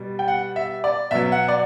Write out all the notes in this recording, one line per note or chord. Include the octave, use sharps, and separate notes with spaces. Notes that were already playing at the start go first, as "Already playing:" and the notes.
Already playing: B2 G3
G5
F#5
E5
D5
B2 F#3 E5
F#5
D5